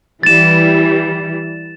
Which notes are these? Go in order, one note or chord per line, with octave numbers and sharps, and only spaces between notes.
E3 G3 A6 E7